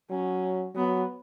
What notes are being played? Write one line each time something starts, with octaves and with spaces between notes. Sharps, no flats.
F#3 C#4
F#3 B3